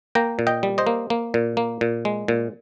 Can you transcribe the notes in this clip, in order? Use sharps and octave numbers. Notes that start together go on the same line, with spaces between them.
A#3 G5 A#5
A#2
D#5 G5
G3
C5 D#5
A#3
A#3
A#2
A#3
A#2
G#3
A#2